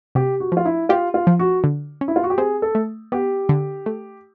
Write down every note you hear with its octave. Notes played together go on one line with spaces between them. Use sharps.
C3 G4
F#4
F3 F4
E4
F4 G4
F4
F3
F#4
D3
C#4
E4
F4
F#4
G4
C4 G#4
A4
A3
B3 G4
D3
A3